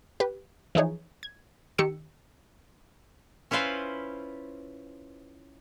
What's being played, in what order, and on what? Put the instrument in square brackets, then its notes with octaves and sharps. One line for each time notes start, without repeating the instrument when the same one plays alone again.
[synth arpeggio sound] G4 B4
E3 F3 D#4 G#4 C#5
G#6
D#3 G4 G5 E6 C#7
[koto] C#4 E4 F4 B4 C5